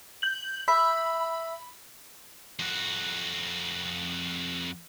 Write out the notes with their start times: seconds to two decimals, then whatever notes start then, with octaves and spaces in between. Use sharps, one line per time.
0.22 G6 F#7
0.68 E5 B5
2.59 F2 F#4